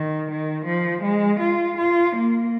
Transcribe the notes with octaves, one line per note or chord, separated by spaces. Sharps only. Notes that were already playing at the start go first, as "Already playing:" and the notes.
Already playing: D#3
D#3
F3
G#3
F4
F4
A#3